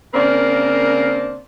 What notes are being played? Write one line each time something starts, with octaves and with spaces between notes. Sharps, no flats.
C#3 A#3 C4 D4 A#4 C5